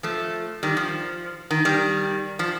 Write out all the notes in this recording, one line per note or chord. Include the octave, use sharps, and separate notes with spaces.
F3 A3
D#3 G3
F3
D#3
D#3 G3
F3